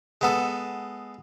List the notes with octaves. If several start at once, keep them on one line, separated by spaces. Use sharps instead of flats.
G#3 B3 A4